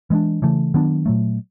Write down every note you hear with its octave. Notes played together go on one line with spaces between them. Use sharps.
E3 G#3 B3 D4
C#3 E3 A3
D#3 F#3 B3 D4
A#2 F#3 A3